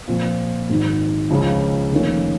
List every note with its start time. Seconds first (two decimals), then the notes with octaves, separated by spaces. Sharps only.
0.08 A#2 F3 C4 F4
0.69 G#1 G#2 D#3
1.30 C#2 C#3 F3
1.92 F1 F2 D#3 A#3 C#4